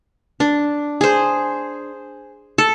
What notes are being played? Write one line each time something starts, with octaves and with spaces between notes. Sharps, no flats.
D4
G#4 C5
A4